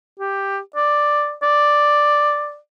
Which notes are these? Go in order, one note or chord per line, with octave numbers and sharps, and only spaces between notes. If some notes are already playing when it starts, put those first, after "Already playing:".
G4
D5
D5